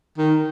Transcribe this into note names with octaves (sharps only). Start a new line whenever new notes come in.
D#3